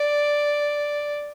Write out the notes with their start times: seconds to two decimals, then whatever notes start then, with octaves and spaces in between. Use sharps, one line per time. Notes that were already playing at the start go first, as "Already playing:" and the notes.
Already playing: D5